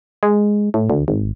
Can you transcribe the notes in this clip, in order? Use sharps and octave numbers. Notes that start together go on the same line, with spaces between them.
G#3
A2
D2
G#1